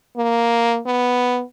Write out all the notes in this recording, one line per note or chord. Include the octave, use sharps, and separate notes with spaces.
A#3
B3